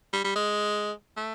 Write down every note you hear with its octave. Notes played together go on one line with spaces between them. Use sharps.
G3
G3
G#3
A3